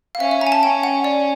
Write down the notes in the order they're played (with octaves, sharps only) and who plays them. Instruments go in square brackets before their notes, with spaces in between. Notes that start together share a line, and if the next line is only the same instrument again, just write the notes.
[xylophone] F5
[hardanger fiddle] C#4 [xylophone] E5
[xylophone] E5
A#5
G#5
A5
[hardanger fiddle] C#4 [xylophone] G5
[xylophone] F#5
D5